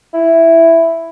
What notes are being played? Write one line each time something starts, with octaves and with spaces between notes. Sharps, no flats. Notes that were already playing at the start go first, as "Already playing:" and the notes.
E4